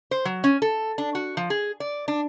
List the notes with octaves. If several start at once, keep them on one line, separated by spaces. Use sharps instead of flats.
C5
F#3
C#4
A4
D4
F#4
F3
G#4
D5
D4